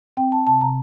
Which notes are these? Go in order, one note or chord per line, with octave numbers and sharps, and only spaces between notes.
C4 G5
C4 A5
C3 A5
C3 A#5